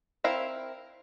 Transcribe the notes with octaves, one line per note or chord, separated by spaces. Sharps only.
C4 E4 A#4 F5